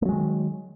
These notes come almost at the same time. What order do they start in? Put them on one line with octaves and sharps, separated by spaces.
A3 F#3 G#3 D#3